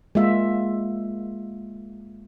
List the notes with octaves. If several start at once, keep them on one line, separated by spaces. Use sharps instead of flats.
G#3 A#3 F4 E5